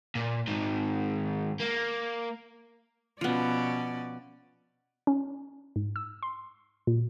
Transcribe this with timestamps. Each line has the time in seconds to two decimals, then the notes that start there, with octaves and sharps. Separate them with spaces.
0.15 A#2
0.47 G#2 D#3
1.60 A#3
3.21 B2 F3 B3 C#4 D5
5.07 C#4
5.76 G#2
5.96 E6
6.23 C6
6.87 A#2